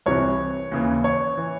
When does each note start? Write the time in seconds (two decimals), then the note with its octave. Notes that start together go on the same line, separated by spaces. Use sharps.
0.06 C2 C3 E3 C#5
0.71 D#2 C#3 E3
1.04 C#5
1.37 E3